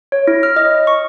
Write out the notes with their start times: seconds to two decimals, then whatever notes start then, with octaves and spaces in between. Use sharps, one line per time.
0.12 C#5
0.28 E4
0.43 F6
0.56 D#5
0.87 C#6